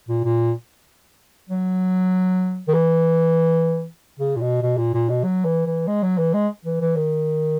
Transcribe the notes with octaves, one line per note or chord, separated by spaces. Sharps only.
A#2
A#2
F#3
D#3
E3
C#3
A#2
B2
B2
A#2
A#2
B2
F#3
E3
E3
G#3
F#3
E3
G#3
E3
E3
D#3